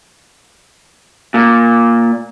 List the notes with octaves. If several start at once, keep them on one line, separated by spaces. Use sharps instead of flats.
A#2